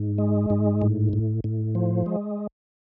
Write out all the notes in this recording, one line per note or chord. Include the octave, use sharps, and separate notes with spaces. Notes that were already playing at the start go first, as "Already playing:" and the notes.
Already playing: G#2
G#3
G#2
A2
A2
A2
F3
G#3